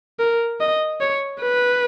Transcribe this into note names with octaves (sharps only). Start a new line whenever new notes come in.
A#4
D#5
C#5
B4